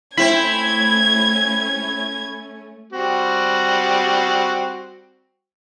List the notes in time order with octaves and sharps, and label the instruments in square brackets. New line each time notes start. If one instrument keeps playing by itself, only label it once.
[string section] A3 C#4 [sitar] C4 E4 [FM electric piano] B5 [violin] G#6
[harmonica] G3 C4 F#4